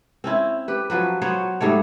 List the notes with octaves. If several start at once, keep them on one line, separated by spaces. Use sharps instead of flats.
C4 C#4 E4
G4 B4
F3 F#3 B4
F#3 B3 C5 C#5
G#2 G3 A3 C#5